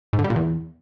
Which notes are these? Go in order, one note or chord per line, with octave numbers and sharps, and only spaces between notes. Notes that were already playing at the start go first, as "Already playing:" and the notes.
G#2
D3
G3
A#2
E2